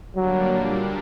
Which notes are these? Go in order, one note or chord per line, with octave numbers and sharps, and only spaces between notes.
D3 F#3 G3 A#3 D4
A#2 G3 A#3 D4